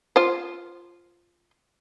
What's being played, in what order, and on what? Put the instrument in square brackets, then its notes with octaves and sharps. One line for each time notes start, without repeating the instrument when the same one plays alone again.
[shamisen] F4 C5